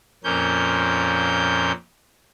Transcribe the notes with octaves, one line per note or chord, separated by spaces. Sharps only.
F2 A#2 A#3 C#4 G6